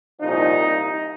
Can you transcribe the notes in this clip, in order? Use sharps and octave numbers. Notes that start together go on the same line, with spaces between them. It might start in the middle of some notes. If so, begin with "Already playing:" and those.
C2 A#2 F3 D#4